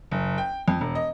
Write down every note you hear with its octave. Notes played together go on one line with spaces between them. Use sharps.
F#1
G5
F2
E1
D#5